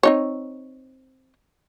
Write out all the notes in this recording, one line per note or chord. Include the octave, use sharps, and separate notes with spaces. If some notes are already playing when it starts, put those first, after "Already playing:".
C4 D#4 C#5